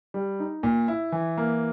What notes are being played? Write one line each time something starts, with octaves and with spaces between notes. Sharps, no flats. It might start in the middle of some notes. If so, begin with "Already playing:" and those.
G3
D#4
A#2
E4
E3
A#3